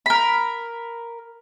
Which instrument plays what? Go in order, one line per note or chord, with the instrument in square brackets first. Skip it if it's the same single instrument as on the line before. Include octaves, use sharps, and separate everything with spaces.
[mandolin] A#4 B5